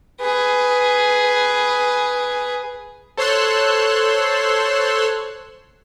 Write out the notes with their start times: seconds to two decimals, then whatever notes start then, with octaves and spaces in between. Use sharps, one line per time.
0.20 G#4 B4
3.17 A4 C5 C#5 C6 E6 F#6